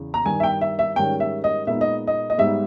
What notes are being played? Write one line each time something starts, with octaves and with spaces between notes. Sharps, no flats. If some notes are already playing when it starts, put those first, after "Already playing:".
Already playing: E2 C#3
A#5
G2 D#3 G3 G#5
E5
G5
E5
E5
G#2 D#3 G3 C#4 G5
E5
D#5
A#2 G#3 B3 D#4 E5
D#5
D#5
D#5
G#2 G3 B3 D#4 E5